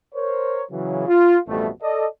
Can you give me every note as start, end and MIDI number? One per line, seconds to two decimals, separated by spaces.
0.15 0.62 70
0.15 0.62 72
0.15 0.62 73
0.71 1.04 49
0.71 1.04 52
0.71 1.04 54
1.07 1.38 65
1.47 1.68 33
1.47 1.68 41
1.47 1.68 47
1.47 1.68 55
1.47 1.68 57
1.82 2.06 69
1.82 2.06 74
1.82 2.06 75